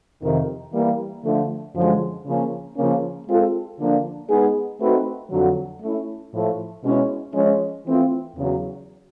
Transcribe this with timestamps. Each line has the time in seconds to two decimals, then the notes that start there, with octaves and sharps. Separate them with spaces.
0.22 F2 C3 D#3
0.72 E3 G3 A#3
1.23 D3 F3 A3
1.75 F#2 D3 F3 G#3
2.26 C#3 F3 A#3 C#4
2.76 C#3 F3 A#3 C#4
3.27 G#3 C4 F4 A4
3.78 D3 F3 A#3 D4
4.29 G#3 B3 D#4 G#4
4.80 A3 C4 D#4 F#4 B4
5.31 F2 D3 F#3
5.82 A3 C#4 E4
6.33 A2 F3 A3
6.84 B2 G#3 C#4 E4
7.34 F3 G#3 C#4
7.85 E3 A3 C4 F4
8.36 E2 C#3 F#3